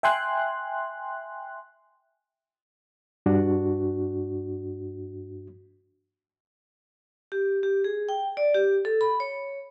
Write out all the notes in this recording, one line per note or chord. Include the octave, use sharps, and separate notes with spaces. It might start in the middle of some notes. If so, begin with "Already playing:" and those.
E5 G5 G#5 C6 F#6
G2 D4 F#4
G4
G4
G#4
G5
D5
G4
A4
B5
C#5